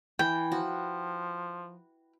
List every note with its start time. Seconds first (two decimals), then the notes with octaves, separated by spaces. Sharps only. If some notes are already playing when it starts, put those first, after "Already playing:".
0.19 E3 G5
0.52 F3 F#4